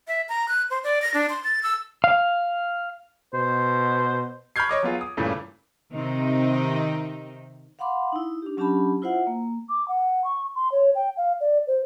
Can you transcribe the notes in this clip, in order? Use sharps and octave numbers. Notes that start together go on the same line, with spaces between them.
E5
A#5
F#6
C5
D5
A#6
D4
C6
A6
E6
F5
B2 C5
B5 C#6 F6 G6 G#6 C7
C#5 D#5 D6
F#3 B3 F4 G#4
D#6
G2 A#2 C#3 E3 A3
C3 D#3 C4 D#4
F5 F#5 B5 C6 D6
D#4 E4
D4 G4
F#3 C#4 D4 G4 A5 B5
E4 F4 C5 E5 F#5
A#3
D6
F#5
C#6
C6
C#5
G5
F5
D5
C5